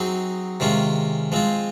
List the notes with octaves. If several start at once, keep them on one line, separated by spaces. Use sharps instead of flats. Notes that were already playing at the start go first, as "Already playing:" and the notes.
Already playing: F#3 C4 D#4 G#4
C3 D#3 G#3 C#4 F4
F3 G#3 C4 F4